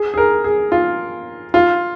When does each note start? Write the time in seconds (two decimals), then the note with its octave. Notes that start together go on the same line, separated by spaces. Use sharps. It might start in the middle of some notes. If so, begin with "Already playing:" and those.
Already playing: G#4
0.14 G#4
0.17 A#4
0.44 G#4
0.72 F4
1.54 F4